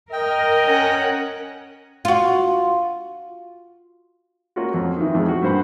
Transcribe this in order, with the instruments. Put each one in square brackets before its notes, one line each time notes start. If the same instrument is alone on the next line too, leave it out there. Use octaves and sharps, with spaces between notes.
[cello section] A#4 [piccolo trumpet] D#5 [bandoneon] G5
[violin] C#4 F#5
[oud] F4 F#4
[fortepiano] A#3 C#4 F4 F#4
F2
D#3 E3
F2 G#3
F#4
G2 A#3 C5 F#5 B5